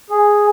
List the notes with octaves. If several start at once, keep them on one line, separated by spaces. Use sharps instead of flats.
G#4